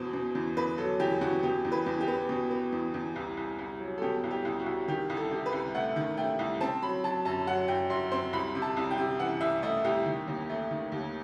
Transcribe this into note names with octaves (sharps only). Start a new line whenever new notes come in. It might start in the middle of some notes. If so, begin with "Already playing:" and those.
Already playing: E2 B2 C5
B2
E2
E2 B4
F#3 A4
E2 G4
E2 F#4
B2 G4
E2
B4
E2
G4
B3
B2
B3
E2
E2
C2
C2
C2
F#3
A4
B2 G4
C2
G4
C2
F#4
C2
D#3 G4
C2
A4
C3
B4
C2
A3 F#5
D#3
A3 G5
C2
C4 A5
F#3 B5
F#3 A5
F#2 A5
F#3 F#5
F#2 G5
F#2 C6
C4 C6
C2 B5
C3
A5
C2
G5
C3
E3 F#5
C2 E5
A3 D#5
C2 G4
D#3
D#2
A3
D#3
D#2